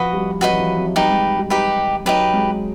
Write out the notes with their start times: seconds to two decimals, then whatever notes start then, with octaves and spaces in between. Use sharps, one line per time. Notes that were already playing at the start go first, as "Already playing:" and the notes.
Already playing: F3 F#4 B4 D#5
0.13 G3
0.41 F#3 F#4 B4 D#5
0.53 E3
0.59 F3
0.77 F#3
0.96 G3 D#4 G4 B4
1.10 G#3
1.38 G3
1.50 D#4 G4 B4
2.05 F#3 D#4 G4 B4
2.33 G#3